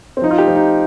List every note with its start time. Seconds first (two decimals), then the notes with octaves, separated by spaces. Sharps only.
0.17 C4
0.22 F3 D#4
0.31 F4
0.38 G4
0.48 F3
0.56 D#4